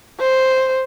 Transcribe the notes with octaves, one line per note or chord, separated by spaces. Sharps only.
C5